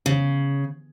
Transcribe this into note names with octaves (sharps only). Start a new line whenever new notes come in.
C#3